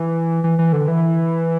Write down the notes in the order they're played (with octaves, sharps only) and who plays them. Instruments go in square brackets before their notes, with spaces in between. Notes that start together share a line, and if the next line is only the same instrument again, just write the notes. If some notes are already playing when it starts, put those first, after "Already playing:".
Already playing: [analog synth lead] E3
E3
E3
D3
E3